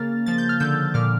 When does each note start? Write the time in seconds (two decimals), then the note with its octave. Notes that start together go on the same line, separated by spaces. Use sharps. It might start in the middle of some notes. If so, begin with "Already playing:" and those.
Already playing: C#3 A#3 F6 A6
0.26 F3 A6
0.38 G6
0.49 F6
0.60 D3 E6 G6
0.94 A#2 D6 F6